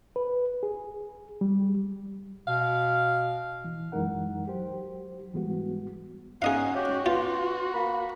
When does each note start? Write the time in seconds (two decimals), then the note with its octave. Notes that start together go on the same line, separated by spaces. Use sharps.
0.16 B4
0.63 G#4
1.41 G3
2.47 B2 F5
3.65 B2 E3
3.92 F#2 E3 G#3 D#4 A#4 F#5
4.46 F#3 G4 C5
5.33 G#2 E3 G3 G#3 B3 F#4
6.42 C#4 D#4 G#4 D#5 F5 F#5
6.75 C#4 F#4 G4
7.06 B2 F4 C6
7.74 A#3 B5